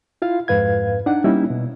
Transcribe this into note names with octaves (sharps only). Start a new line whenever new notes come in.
E4 F4 F5
F2 G#2 B4 F5 G#6
D4 D#4 F#5
G3 A#3 C#4 D#4 E4
B2